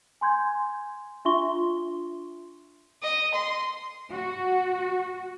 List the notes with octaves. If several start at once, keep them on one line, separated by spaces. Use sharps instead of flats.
G#5 C6 G6 G#6
D4 F4 E5 C6 C#6 G7
D#5
C6
F#4